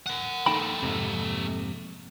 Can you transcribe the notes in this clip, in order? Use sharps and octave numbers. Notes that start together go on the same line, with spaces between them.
A#4 F#5
A#3 D#4 A4 G5 B5
F2 G#2 C3